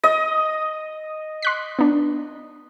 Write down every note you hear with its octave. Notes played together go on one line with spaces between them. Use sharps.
D#5
C6 F#6 B6
B3 D4